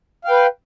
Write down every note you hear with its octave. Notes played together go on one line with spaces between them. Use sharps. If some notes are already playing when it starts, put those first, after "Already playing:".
B4 F5 G5